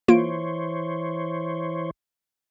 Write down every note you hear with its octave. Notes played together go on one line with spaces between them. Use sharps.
E3 A#3 F4 C5 C#5 D7